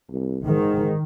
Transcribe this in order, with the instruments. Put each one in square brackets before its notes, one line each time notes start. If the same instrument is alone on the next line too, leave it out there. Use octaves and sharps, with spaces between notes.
[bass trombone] C2
[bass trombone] G#2 [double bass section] D#3